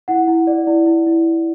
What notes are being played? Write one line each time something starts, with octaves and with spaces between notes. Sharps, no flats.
E4 F#5
E4
D5
E4
E4
E4